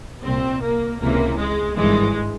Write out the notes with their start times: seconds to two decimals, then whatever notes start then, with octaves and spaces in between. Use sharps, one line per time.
0.23 C2 A#2 C4
0.63 A#3
1.00 C#2 C3 E3 A#3
1.38 G#3
1.76 G#1 G2 E3 G#3